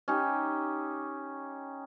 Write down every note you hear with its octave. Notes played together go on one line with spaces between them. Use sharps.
C#4 D#4 G4